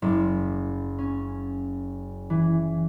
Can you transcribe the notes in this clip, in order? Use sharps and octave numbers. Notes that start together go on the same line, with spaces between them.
F#1
C#4
E3